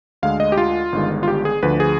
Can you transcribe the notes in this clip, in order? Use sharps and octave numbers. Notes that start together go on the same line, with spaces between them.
D2 D3 G#3 F5
D#5
G4
F4
G1 G2 D#3 G#3
F4
G4
G#4
D2 D3 F3 B4
G#4